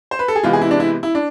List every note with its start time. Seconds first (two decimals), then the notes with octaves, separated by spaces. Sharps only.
0.11 C5
0.19 B4
0.28 A4
0.35 G#4
0.43 C3 E3 G#3 B3 F4
0.53 G#4
0.62 E4
0.71 D4
0.80 E4
1.03 E4
1.15 D4